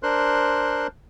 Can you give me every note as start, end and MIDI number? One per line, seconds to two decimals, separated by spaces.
0.03 0.87 62
0.03 0.87 70
0.03 0.87 72
0.03 0.87 84
0.03 0.87 90